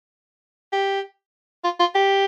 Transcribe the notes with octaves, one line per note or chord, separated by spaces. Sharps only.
G4
F4
F4
G4